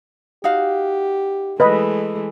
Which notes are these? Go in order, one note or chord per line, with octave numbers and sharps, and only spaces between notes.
D#4 F#4 G4 F5
E3 G#3 A3 B4 D#5 B5